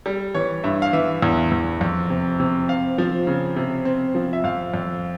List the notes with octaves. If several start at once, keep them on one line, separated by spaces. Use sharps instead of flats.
G3
E3 C#5
G2 E5
F5
E3 E5
E2
E2
F2
C3
C3
C4 F5
F3
C#3
C3
C4
F3
E5
F2 F5
F2